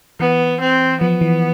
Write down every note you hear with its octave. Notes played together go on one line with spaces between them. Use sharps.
E3 B3
C4
F3 B3
E3